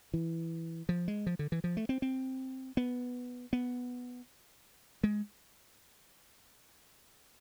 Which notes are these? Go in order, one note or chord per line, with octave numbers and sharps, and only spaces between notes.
E3
F3
G#3
F3
D3
E3
F3
A3
C4
C4
B3
B3
G#3